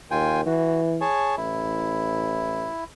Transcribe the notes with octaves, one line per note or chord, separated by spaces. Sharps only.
D#2 F4 G5 G#5
E3 F#4
G#4 C#5 A5
A1 E4